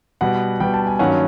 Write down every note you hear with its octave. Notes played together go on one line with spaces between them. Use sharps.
B2 G3 B3 F#5
B2 G3 B3 G5
A5
G#5
G2 D#3 F#3 A#3 C#4 F#5